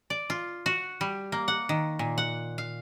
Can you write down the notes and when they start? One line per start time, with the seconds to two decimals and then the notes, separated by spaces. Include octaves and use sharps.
0.10 D5
0.30 F4
0.66 F#4
1.01 G3
1.32 A#3
1.48 F#5
1.69 D#3
1.99 A#2
2.18 F#5
2.58 F5